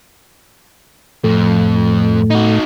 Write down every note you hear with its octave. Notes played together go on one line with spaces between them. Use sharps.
F2 A2 A3
D#4 F#4